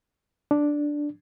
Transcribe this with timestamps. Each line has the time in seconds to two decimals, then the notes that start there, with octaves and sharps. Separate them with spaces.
0.51 D4